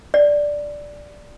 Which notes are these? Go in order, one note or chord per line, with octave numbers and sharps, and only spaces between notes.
D5